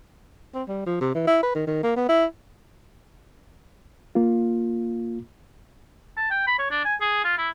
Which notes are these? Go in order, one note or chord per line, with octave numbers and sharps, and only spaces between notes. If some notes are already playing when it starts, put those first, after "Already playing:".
C4
G3
F3
C3
E3
E4
B4
D#3
D#3
A#3
B3
E4
A#3 F4
A5
G5
B5
C#5
D4
G#5
G#4
F4
E4